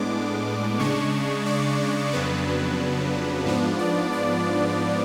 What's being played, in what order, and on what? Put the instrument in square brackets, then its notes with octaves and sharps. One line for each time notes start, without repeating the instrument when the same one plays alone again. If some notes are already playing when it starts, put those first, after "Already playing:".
Already playing: [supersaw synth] A2 G#3 B3 D4 D6
C#3 G#3 D4 C#6
D5
F2 C#3 F#3 B3 D4 B4
G#2 F3 B3 D4
D5
D5